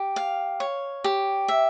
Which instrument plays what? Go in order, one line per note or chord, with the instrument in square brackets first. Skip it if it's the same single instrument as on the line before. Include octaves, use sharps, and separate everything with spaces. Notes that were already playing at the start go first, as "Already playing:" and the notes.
Already playing: [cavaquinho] G4
F5
C#5
G4
E5